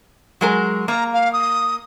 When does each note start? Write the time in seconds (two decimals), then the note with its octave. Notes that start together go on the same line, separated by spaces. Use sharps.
0.41 F#3 G#3 A#4
0.88 A#3 A#5
1.13 F5
1.33 D#6